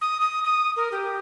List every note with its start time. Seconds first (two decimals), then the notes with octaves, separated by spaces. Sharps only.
0.01 D#6
0.21 D#6
0.44 D#6
0.76 A#4
0.92 G4